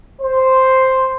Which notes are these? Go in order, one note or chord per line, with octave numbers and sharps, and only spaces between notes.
C5